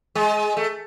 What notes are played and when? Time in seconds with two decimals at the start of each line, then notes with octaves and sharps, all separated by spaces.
0.15 G#3
0.57 A3